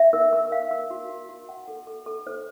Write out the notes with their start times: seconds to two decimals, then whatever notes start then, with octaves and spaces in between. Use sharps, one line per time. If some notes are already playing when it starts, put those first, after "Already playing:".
Already playing: E5
0.13 A#4
0.33 A#4
0.52 F5
0.71 A#4
0.91 F#4
1.09 F#4
1.29 F#4
1.49 F#5
1.68 A4
1.87 A4
2.06 A4
2.27 C5